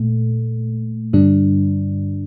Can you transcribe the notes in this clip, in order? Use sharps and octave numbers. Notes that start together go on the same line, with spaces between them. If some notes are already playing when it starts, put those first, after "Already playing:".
Already playing: A#2 A3
G2 D3 G3 D4